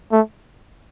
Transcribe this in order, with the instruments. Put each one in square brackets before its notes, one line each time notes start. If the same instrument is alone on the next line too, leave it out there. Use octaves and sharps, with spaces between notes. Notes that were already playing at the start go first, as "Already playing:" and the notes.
[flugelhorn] A3